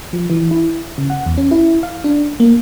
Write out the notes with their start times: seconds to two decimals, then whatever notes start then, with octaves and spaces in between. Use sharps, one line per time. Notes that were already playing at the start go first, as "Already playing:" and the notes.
0.13 F3
0.30 E3
0.51 E4
0.98 C#3
1.10 F#5
1.26 E2
1.37 C#4
1.51 E4
1.83 F5
2.04 D4
2.40 A#3